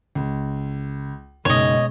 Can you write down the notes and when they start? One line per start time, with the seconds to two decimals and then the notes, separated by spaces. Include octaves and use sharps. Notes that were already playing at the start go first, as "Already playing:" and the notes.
0.15 C#2
1.45 F#1 B2 G#3 D#4 C#5 D#5 G7